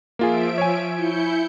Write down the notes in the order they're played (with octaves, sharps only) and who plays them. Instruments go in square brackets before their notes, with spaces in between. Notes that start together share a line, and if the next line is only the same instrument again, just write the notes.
[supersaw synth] F3 E5 D7 [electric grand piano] A#3 F4 G#4
[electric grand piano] C#5 G#5
[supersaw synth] E4 G6 C#7